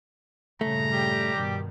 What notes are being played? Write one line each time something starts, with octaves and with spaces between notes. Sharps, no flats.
G2 A#2 C#3 A3 A#5
G3 G4
G2 B2 D#3